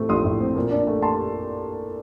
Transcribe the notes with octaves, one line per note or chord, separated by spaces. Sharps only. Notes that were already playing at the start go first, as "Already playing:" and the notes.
Already playing: A2 A3 C4
A#1 C6 D#6
A2
C4
A#2
D4
A3
A5 C6